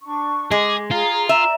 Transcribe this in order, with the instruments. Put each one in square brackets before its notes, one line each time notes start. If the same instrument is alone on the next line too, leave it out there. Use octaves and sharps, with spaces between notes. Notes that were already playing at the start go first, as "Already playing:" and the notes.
[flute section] D4 C#6
[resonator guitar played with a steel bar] G#3 [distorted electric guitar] G#4 [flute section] D6
[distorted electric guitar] F4 [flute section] G#4 A#5
[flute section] D5 A#5 [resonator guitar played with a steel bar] E5